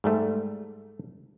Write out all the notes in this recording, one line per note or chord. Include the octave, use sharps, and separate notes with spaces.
G#2 G3 A3